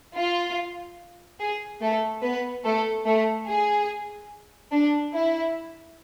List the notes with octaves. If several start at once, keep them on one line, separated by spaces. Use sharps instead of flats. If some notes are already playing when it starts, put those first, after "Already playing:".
F4
G#4
A3 A4
B3 B4
A3 A4
A3 A4
G#4
D4
E4